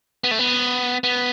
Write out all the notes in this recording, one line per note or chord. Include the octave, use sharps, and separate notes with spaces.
B3
A3
B3
B3